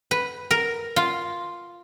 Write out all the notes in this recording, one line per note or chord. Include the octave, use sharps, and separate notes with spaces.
B4
A#4
F4